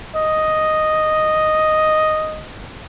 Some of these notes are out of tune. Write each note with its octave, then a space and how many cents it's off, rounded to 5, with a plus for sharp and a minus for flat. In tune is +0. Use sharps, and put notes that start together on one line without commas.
D#5 +0